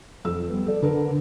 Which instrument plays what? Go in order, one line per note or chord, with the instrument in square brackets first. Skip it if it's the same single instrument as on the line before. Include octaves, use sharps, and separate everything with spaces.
[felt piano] F2 E6
G3 B3
A4 D5
[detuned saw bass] D3 [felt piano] D4 A#4 B4